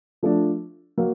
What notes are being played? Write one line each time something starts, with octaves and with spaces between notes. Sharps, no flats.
F3 A3 D4
F#3 A#3